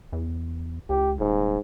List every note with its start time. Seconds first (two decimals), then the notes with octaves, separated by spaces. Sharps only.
0.12 E2
0.89 C#2 G4
1.19 D#1 G#2